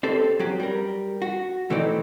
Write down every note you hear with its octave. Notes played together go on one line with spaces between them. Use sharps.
C4 G4 A4 C5
F#3 C4 C#4 F#4 G4
G3 A#4
F#4
B2 E3 A3 C4 D#4 D5